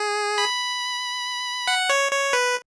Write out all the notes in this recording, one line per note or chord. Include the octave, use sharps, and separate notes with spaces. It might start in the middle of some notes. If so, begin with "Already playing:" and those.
Already playing: G#4
B5
F#5
C#5
C#5
B4